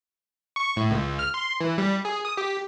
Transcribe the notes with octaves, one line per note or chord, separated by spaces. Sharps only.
C#6
A2
C#2
F6
C6
E3
G3
G#4
D#6
G4